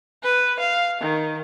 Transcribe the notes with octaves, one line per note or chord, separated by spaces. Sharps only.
B4
F5
D#3